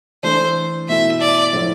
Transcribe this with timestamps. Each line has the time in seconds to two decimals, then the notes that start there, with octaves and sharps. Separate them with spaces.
0.23 E3 A3 D4 C5
0.87 B2 A3 E4 E5
1.20 D5
1.53 A2 F3 B3 E4